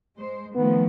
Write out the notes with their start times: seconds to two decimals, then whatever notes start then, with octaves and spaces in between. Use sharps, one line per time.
0.16 G#3 C5
0.55 D#3 F3 A3 B3